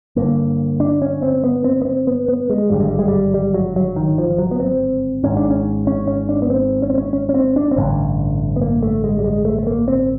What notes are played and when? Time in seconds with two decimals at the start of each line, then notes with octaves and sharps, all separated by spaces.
0.16 G1 G2 D3 A#3
0.80 D4
1.02 C#4
1.23 C4
1.44 B3
1.64 C4
1.82 B3
1.85 C4
2.07 B3
2.28 B3
2.50 G#3
2.70 G#1 G2 D3 G3
2.80 G#3
2.89 G3
2.99 G#3
3.08 G3
3.34 G3
3.54 F#3
3.76 F#3
3.96 D#3
4.18 F3
4.38 F#3
4.51 B3
4.60 C4
5.23 G#1 G#2 C#4
5.37 D4
5.50 C#4
5.87 C#4
6.07 C#4
6.29 D4
6.42 B3
6.50 C4
6.82 C#4
6.90 C4
6.98 C#4
7.13 C#4
7.29 C#4
7.34 C4
7.56 D4
7.71 C4
7.76 A1 G2 D3 C#4
8.56 B3
8.62 A#3
8.83 A3
9.04 G#3
9.19 G3
9.24 G#3
9.45 A3
9.59 A3
9.67 A#3
9.88 C4